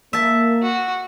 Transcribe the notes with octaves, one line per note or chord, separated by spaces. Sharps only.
A#3 E5 A5
F#4